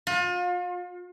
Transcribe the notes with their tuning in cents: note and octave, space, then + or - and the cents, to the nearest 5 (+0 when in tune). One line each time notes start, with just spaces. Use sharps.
F4 +35